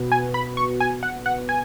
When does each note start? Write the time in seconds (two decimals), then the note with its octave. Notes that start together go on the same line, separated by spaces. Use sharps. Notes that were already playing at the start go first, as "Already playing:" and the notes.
Already playing: B2 B3 F#4 B4
0.12 G#5
0.34 B5
0.57 C#6
0.80 G#5
1.03 F#5
1.26 F#5
1.49 G#5